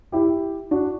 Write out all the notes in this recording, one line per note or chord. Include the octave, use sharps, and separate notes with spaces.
E4 G4
D4 F#4